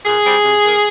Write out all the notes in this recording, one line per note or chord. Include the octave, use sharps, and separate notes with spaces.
A#2 G#4
G3 C4
C3
D#3 A#3